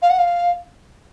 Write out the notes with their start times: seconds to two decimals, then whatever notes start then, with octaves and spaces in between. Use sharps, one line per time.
0.01 F5
0.09 F#5
0.18 F5